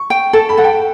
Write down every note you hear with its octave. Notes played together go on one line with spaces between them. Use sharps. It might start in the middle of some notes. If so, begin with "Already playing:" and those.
Already playing: C#6
G5
A4 A5
B5
A4 F#5
G5